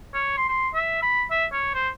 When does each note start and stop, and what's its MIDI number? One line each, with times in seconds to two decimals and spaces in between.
0.14 0.37 73
0.37 0.47 84
0.49 0.68 84
0.75 1.00 76
1.02 1.24 83
1.31 1.46 76
1.52 1.71 73
1.74 1.89 72